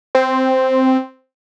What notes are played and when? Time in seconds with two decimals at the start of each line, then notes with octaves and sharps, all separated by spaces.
0.15 C4